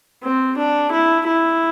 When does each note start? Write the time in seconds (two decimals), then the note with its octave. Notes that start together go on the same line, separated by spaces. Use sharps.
0.24 C4
0.57 D4
0.92 E4
1.27 E4